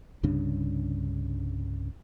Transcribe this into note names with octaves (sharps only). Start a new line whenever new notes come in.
C2 G2 C#3 D4